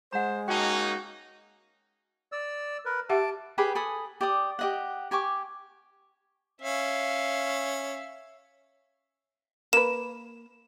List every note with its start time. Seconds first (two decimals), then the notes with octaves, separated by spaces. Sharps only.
0.13 G#3 C5 F#5 A#5
0.48 A#3 C#4 D#4 F#4 G5 A5
2.32 D5 E6
2.85 A#4 B4
3.09 G4 E5 F#5 A5 D6
3.58 G4 G#4 B4 B5
3.75 A4 G#5 B5 D#6
4.21 G4 D5 D#6
4.59 G4 D#5 F#5
5.11 G4 G#5 C#6 D6
6.62 C#4 E5 F5
9.73 A#3 B4 E7